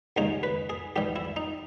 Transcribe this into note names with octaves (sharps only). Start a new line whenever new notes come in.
D#2 C#3 G#3 D#4 G#4
B4
G#4
G#2 E3 G3 G4
E4
D#4